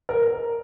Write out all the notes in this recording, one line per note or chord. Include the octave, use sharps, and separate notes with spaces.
A#4